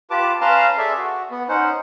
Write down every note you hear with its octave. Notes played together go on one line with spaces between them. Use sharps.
F4 G4 B4 A5 D6
C#4 B4 F5 A5 A#5 C6
G#4 A4 D5 E5
F#4
B3
C#4 D#4 C5 F#5